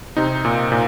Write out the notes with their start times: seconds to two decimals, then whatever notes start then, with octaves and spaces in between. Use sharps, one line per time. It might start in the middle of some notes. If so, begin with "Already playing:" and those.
0.17 C3 D#4
0.45 A#2
0.72 A#2